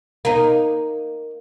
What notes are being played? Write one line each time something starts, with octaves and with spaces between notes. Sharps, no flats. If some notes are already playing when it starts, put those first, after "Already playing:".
A#3 D#4